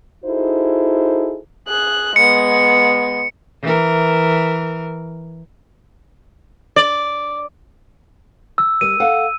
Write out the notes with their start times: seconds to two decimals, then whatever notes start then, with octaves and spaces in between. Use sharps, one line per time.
0.25 D#4 E4 F#4 G#4 A4 C5
1.68 G#4 F#6
2.16 G#3 B3 C#7
3.63 E3 A#4
6.76 D5
8.58 E6
8.81 G3 A#4 D#7
9.00 A4 F5 F#5